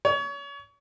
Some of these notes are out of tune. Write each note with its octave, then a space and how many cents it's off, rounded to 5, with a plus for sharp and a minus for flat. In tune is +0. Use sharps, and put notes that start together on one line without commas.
C#5 +30